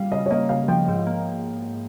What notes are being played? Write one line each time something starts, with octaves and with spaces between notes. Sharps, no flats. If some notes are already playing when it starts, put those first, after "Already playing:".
Already playing: G3 F5
C#3 D#5
C#5
A#3 D#5
C#3 F5
F3 G5
G#2
A#3